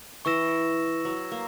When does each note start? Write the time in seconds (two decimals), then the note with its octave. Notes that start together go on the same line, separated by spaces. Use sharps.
0.25 E3 C#6 E6 A#6 E7
1.05 F#3
1.31 A#3